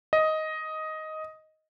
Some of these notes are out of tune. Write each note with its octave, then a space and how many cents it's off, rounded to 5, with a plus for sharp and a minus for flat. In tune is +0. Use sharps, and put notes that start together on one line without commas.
D#5 +10